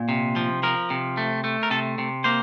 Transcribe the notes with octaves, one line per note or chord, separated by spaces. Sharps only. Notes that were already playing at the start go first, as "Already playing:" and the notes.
Already playing: A#2
C3
F3
F3 A#4
C3
A3
A3
A#4
C3 A4
C3
A#3 C5